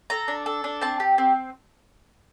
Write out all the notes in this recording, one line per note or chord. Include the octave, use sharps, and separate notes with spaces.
A4 A#5
D4
A4
D4
C4 A5
G4
C4